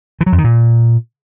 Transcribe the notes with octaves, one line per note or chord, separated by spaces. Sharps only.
E3
F#3
F2
D#3
A#2